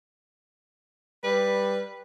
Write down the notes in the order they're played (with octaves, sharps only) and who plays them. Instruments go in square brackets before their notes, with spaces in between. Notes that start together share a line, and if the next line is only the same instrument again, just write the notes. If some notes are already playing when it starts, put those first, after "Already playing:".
[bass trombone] G3 [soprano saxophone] B4